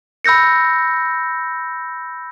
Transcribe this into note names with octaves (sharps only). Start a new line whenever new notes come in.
B5 E6 G6 A#6 C#7